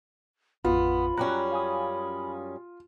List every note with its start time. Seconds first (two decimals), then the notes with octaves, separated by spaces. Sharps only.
0.65 A1 F2 B3 F4 B5
1.17 F#2 G3 C#4 A#5 F#6
1.52 F5 G#5 D#6